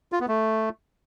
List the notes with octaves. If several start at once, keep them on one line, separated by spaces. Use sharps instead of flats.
F4
B3
A3